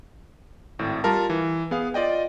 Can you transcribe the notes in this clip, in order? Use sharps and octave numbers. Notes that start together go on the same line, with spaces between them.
G#1 A2
G3 F4 A#4 A5
E3
B3 G#4 F5
F4 D5 D#5 G5